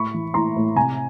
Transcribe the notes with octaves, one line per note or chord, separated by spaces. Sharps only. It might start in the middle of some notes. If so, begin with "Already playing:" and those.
Already playing: A2 B5 C#6
E3
E3 A#5 C6
A2
C3 G#5 A#5